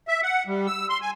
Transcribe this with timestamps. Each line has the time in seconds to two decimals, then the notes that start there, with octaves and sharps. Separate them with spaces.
0.08 E5
0.23 F#5
0.47 G3
0.67 E6
0.90 C6
1.01 G#5